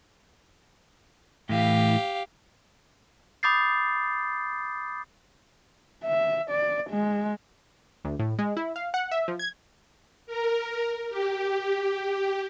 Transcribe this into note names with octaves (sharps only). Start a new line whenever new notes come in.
A2 E3 G4 F5
B5 D6 D#6 G6 A6 C7
E5
D5
G#3
D2
A2
G#3
E4
F5
F#5
E5
F3
G#6
A#4
G4